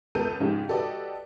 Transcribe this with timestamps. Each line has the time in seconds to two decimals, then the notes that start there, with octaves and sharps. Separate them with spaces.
0.15 C#2 B3 A4 A#4 G6 D#7
0.40 G#2 C#3 F3 D#4 F4 G4
0.68 F#4 G4 A4 B4 D5 D#5